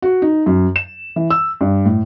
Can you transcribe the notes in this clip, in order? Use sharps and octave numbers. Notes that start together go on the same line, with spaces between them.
F#4
D#4
F#2
E7
E3
E6
G2
A2